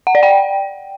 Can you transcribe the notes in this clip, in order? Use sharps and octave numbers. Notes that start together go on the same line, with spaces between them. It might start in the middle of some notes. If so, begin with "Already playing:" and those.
F#5
D5
G5